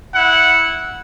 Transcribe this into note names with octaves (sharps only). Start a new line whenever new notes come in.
E4 F#5